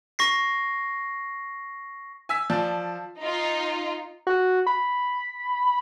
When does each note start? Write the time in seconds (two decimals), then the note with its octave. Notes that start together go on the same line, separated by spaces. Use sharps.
0.19 C#6 A#6 C7
2.29 G#5 E6 B6
2.50 F3 D5 A5
3.21 D#4 F4
4.27 F#4
4.67 B5